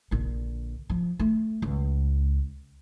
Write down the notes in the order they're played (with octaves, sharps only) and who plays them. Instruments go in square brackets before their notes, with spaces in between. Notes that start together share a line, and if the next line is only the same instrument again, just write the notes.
[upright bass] A#1 D3
F3
A3
C#2